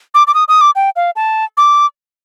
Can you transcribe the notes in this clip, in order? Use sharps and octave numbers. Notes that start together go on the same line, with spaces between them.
D6
D6
D#6
D#6
D6
G5
F5
A5
D6